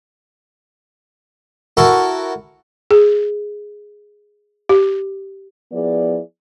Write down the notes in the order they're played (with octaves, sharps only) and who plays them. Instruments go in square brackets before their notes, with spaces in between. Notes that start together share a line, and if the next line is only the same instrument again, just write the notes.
[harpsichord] E4 F#4 A4 A#4 C#6
[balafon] G#4
G4
[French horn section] F3 B3 E4 G#4 D5